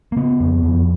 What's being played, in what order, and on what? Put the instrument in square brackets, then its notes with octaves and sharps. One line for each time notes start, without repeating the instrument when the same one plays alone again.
[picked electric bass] A#3
C#3 B3
F2
F2